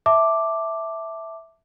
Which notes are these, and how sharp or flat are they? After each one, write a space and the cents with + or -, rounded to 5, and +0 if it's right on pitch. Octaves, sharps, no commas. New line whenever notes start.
E5 -5 A5 +0 D6 +0